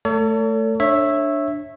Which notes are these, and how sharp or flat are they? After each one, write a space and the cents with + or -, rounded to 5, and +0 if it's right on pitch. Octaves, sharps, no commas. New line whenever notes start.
A3 +0 A4 +35 C#5 +40
D4 +0 C#5 -20 E5 +0